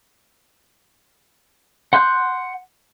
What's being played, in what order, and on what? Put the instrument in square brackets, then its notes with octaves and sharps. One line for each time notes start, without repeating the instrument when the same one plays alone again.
[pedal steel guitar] F#5 C6 F#6 G6